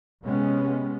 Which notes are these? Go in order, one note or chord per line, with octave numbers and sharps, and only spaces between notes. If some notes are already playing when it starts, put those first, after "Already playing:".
C3 G#3 B3 C#4